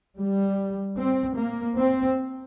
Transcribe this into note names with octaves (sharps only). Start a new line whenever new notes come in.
G3
C4
A#3
C4